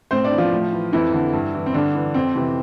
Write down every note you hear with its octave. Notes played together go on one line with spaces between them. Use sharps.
A2 C4 C5
D4 D5
E3
F3 F4
A2
E3
F2 E3 E4
D3
G2
E3
C4
G2 D3 D4
E3
F2 C4
C3 E3